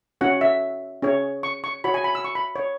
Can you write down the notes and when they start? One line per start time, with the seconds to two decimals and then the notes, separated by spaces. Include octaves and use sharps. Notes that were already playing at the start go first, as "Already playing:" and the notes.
0.21 C#4 F#4 C#5 F#5
0.41 E5
1.02 C#4 G#4 C#5
1.43 C#6
1.64 C#6
1.84 F#4 C#5 B5
1.94 G#5
2.04 B5
2.15 E6
2.24 C#6
2.35 B5
2.56 C#5